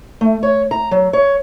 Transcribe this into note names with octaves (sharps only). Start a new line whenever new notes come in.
A3
C#5
A#5
F#3
C#5